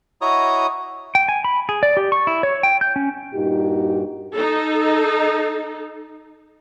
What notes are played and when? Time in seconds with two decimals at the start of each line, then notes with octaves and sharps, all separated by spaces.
0.21 E4 F#4 C#5 D#5 A#5 D#6
1.15 G5
1.28 G#5
1.45 B5
1.69 G#4
1.83 D5
1.97 G4
2.12 C#6
2.27 E4
2.43 C#5
2.63 G5
2.81 G6
2.96 C#4
3.34 G2 A#2 D#4 F#4 G4
4.34 D#4 A4